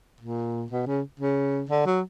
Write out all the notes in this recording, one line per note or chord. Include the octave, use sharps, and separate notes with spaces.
A#2
B2
C#3
C#3
D3
F#3